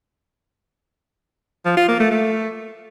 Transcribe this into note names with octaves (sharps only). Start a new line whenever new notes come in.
F3
F4
A#3
A3
A3